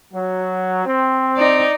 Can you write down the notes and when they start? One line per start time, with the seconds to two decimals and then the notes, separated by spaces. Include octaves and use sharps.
0.12 F#3
0.85 C4
1.36 D#4 D5